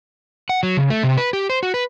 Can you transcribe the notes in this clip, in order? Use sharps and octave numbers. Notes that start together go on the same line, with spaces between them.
F#5
F#3
C#3
A3
C3
B4
G4
C5
F#4
B4